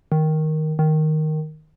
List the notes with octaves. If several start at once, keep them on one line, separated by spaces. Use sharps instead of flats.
D#3
D#3